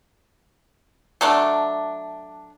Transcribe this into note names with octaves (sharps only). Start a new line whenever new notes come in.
F#3 A3 D4